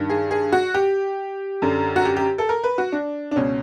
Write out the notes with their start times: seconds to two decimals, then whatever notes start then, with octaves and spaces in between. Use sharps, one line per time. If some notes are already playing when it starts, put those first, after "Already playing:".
Already playing: G2 D#3
0.10 G#4
0.31 G#4
0.52 F#4
0.74 G4
1.62 F#2 D3
1.96 F#4
2.05 G4
2.16 G4
2.38 A4
2.49 A#4
2.64 B4
2.78 F#4
2.92 D4
3.31 D4
3.36 C#2 B2 C#4